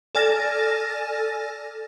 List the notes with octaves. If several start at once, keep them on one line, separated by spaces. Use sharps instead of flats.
A4 D5 G#5 F6 A6 A#6